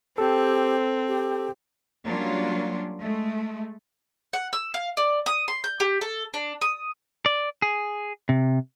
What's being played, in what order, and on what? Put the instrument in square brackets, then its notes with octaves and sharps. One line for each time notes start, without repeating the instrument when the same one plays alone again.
[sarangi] C4 [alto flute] G4 [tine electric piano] A4
[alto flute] G4
[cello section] F#3 G3 A#3 C#4 D4 F4
G#3 A3
[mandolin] F#5
E6
F5
D5
D#6
C6
G6
G4
A4
D4
D#6
[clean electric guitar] D5
G#4
C3